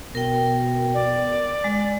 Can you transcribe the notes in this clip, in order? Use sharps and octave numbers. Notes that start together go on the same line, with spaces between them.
B2 A#4 G5
D5
G#3